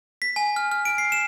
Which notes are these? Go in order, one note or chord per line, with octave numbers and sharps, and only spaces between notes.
B6
G#5
F6
F6
D7
C7
E7